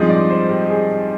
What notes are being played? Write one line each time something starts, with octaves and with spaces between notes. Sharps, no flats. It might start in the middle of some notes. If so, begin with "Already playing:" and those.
Already playing: G2 F3 G#3 C4 D#4 D#5
D5
C5
G4
G#4